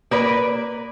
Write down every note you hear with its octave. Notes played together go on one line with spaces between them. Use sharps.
A#3 B4 D5